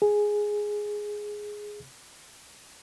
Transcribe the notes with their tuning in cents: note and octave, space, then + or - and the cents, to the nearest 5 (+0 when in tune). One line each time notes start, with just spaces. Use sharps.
G#4 +0